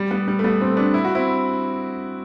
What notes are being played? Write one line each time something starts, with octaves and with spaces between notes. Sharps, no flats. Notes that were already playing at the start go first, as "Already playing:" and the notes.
Already playing: G3
G3 B3
G3
A3
G3 B3
A3 C4
B3 D4
E4
F#4
C4 E4